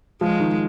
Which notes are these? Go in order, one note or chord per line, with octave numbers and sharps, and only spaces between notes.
F3 G#3
D#3